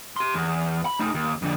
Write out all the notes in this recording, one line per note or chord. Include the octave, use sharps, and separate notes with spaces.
G4 C6
E2
B5
A3 D#4
D#2
F2 D3